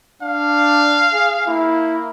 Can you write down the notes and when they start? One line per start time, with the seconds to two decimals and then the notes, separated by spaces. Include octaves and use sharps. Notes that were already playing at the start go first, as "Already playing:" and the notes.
0.22 D4 F5
1.13 G#4
1.47 A#3 E4